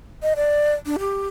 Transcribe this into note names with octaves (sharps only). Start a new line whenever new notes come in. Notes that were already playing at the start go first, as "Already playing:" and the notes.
D#5
D5
D4
G4